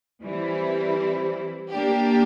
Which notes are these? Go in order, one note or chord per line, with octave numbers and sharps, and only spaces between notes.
E3 G3 C4 E4
A#3 D4 G4